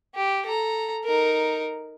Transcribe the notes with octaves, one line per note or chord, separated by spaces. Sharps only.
G4
A4 A#5
D#4 A#4